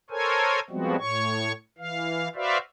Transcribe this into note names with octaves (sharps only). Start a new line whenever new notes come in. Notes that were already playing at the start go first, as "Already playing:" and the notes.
A4 A#4 C5 C#5 G#5
F3 G3 G#3 B3 C4 F#4
A2 C#5 C#6
E3 F5
F#4 B4 C5 D5 E5 F5